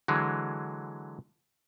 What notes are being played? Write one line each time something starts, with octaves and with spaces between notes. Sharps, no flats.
D3 E3 F#3 G#3